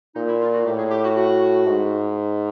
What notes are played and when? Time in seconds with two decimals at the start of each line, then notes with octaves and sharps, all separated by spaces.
0.16 A#2 D#4
0.29 E4
0.41 F4
0.54 F#4
0.65 A2 G4
0.78 G#4
0.91 G4
1.03 F#4
1.16 F#4
1.65 G#2